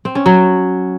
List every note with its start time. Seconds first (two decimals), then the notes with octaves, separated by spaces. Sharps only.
0.05 C4
0.15 C#4
0.26 F#3